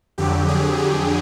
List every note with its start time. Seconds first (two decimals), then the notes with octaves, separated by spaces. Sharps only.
0.18 F2 D3 F#3 G4
0.48 G#4
0.78 G4